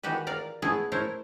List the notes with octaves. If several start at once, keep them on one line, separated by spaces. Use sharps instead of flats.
D#3 E3 F#4 G4 B4
A#4 D5 F5
A3 B3 E4 G#4
A3 E4 A#4 C5 C#5